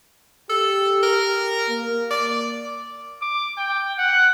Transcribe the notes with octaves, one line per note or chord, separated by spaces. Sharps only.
G4 A4
A#4
A#3
D5
D6
G5
F#5